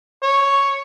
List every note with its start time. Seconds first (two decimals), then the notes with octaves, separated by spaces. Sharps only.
0.23 C#5